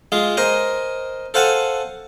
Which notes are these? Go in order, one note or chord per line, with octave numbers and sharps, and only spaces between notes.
G#3 F4 G#4
A#4 C5 D#5 G#5
A4 C5 F5 F#5 G#5 A5